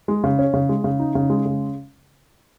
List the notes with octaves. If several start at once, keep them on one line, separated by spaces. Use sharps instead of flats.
G#3
C#3
C#4
C#3
G#3
C#3
D#4
C#3
G#3
C#3